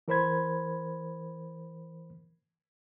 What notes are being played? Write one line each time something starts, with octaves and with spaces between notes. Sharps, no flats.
E3 A#4 C5 B5 G#6